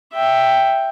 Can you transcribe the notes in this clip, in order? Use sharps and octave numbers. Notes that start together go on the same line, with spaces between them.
E5 G5